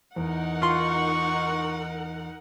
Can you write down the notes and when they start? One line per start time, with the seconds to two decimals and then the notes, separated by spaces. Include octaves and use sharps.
0.16 E2 D#4 A#4 F#5
0.62 F4 C6 C#6